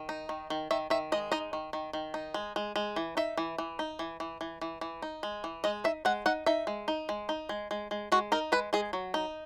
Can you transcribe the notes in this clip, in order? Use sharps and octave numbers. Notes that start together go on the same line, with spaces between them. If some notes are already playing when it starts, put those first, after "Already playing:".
Already playing: D#3
D#4
D#3
D#3
D#3 E5
D#3 E5
G#3 D#5
D#4 D#5
D#3
D#3
D#3
D#4
G#3
G#3
G#3
E3
D#4 E5
E3
E3
D#4
E3
E3
E3
E3
E3
D#4
G#3
E3
G#3 D#5
D#4 E5
G#3 F#5
D#4 F#5
D#4 E5
G#3
D#4
G#3
D#4
G#3
G#3
G#3
G#3 F#4
D#4 A#4
G#3 B4
G#3 G#4
F#3
D#4